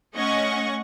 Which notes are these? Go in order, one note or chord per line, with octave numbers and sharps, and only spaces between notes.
A3 C#4 D#5 F#5 C#6